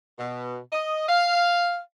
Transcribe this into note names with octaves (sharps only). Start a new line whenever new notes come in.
B2
D#5
F5